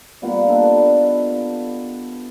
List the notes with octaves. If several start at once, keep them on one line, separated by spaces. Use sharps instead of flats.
G3 A#3 B3 F4
D4 A4 B4 D#5